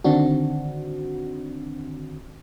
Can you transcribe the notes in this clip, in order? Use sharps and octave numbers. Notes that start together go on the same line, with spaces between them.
D3 D#3 C4 D4 F#4